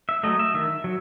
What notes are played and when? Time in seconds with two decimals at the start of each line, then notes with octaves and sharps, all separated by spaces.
0.09 E5
0.23 F#3 A3 D#5
0.39 E5
0.54 D#3 E5
0.84 F#3